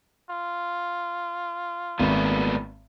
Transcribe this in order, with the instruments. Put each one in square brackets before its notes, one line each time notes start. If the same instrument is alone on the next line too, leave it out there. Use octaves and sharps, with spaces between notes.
[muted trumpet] F4
[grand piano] G#1 [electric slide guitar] A#2 A3 B3